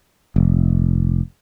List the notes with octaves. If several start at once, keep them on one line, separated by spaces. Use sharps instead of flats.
F1